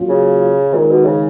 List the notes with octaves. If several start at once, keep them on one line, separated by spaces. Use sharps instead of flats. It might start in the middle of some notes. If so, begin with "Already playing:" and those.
Already playing: A#2 F#3 C#4 F4
C#3
A#2 D#3 G#3 D#4
B2
C#3